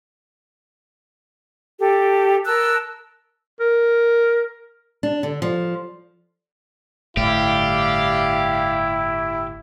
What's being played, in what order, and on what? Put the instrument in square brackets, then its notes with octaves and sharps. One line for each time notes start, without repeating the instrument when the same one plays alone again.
[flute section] G4 A4
A#4 A5 E6 F#6
[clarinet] A#4
[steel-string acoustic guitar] D4
D3
F3
[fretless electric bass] G1 A2 [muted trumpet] E4 [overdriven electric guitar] G4 [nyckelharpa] D5 F5